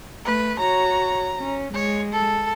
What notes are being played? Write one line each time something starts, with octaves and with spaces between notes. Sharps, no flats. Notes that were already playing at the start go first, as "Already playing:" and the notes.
A3 B4
F#4 C#5 A#5
C#4
G#3 C#5
A4